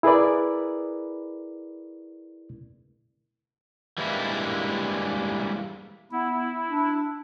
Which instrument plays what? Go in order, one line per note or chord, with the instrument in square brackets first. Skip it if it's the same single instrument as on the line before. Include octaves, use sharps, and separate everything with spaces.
[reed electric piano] E4 G#4 A#4 B4 D5
[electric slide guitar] E3 G3 G#3 A#3 D4 E4
[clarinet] B3 [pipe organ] E4
[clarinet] D4